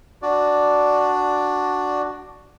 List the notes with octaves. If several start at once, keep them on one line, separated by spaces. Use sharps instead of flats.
D4 F#4 D5